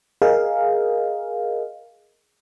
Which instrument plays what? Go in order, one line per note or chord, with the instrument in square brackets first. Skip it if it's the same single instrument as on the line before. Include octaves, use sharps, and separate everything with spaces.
[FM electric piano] G#4 A#4 D#5 F5